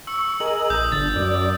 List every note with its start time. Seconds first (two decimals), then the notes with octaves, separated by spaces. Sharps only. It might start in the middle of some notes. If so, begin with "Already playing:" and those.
0.07 C#6 E6
0.40 G#4 A#4 D#5 F#7
0.70 A#1 D#6 G6
0.92 G1 D3 A6
1.16 F#2 D5